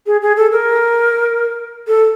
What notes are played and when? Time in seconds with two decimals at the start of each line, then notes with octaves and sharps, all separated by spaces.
0.06 G#4
0.22 G#4
0.37 A4
0.52 A#4
1.88 A4